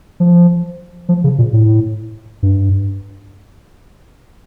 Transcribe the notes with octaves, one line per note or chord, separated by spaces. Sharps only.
F3
F3
C#3
A#2
A2
G2